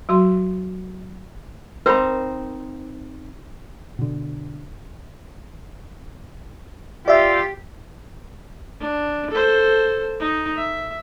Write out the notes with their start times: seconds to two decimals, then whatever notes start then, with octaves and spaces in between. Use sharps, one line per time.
0.09 F#3 F#4 C6
1.86 C4 D#4 A#4 C5 B5
3.99 B2 D3
7.08 F4 G4 D5 E5
8.80 D4
9.30 A4 C5
10.20 D#4
10.56 E5